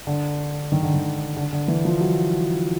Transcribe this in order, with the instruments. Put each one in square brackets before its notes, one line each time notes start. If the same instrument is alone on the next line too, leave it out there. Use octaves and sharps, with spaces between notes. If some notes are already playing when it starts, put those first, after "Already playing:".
[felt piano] D3
D#3
D3
D#3
D3
D3
E3
F3
F#3